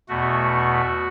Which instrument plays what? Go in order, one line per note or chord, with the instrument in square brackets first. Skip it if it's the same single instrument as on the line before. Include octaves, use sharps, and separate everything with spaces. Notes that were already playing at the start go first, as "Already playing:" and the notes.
[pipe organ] E2 B2 A3 F#4